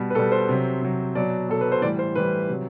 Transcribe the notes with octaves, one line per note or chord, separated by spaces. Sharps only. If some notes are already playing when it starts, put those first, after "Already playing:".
Already playing: B2 G3
B4
B2 G3 A4
C5
C3 F#3
C3 F#3
B2 F#3 D5
B2 F#3 A4
B4
C5
A2 E3 G3 D5
C5
A2 E3 G3 B4
C3 F#3